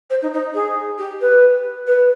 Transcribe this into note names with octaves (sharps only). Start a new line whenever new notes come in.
C5
D#4
D#4
G#4
G4
B4
B4